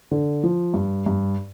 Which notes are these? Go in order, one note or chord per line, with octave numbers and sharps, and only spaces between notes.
D3
F3
G2
G2